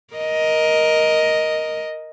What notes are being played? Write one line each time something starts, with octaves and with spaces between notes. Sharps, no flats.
A#4 D#5